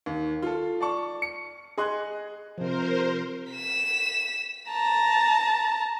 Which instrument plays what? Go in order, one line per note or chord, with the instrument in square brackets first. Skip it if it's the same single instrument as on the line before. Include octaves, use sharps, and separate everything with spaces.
[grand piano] D#2
F4 A4
D5 A5 C#6
C#7
G#4 D#5 C6 F#6
[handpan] C3 F3 [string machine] A#4 C5
[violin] B6 E7
A5 A#5